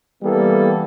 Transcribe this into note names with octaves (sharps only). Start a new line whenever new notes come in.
E3 G3 A#3 B3 A4